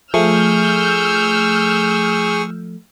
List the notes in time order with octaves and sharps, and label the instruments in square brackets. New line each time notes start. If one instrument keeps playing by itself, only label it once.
[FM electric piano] F3 A3 [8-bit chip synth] G#4 C#6 [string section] E6 F6 G6